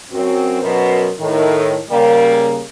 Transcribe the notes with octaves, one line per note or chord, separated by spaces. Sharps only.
F#2 C4 F#4
F#2 B2 B3 A#4 C5
A2 D#3
C#3 G3 A#3